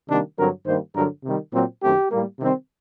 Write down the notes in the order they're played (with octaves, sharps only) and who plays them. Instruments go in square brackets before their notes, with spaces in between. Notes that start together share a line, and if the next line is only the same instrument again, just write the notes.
[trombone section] C3 D#3 G3 A#3 D4
G2 D3 F#3 C4 A#4
G2 D#3 G3 A#3 C5
G2 D3 F#3 A#4
C3 D#3 G3
A#2 F#3 C4
F#2 D#3 A3 C4 G4
A2 G3 A#3
C3 D#3 G3 C4